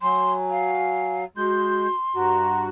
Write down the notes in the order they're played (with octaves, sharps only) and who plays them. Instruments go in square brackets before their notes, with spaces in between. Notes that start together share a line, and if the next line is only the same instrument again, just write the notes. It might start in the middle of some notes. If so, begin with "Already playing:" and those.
[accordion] F#3 [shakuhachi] G#5 [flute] C6
[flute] F5
[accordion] G#3 G6 [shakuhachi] F#4 [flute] C6
[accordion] G2 F#4 [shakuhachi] A#5